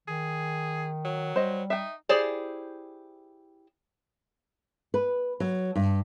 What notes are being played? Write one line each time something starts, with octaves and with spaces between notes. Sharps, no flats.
D#3 G#4
F#3
G3 C5 D#5
D#4 E5 G5
E4 G4 G#4 C5 D5
B4
F#3
G2